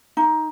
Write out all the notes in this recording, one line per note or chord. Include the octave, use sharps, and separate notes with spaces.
D#4